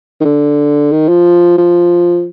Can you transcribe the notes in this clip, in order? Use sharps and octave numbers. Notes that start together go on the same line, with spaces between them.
D#3
D3
D#3
F3
F3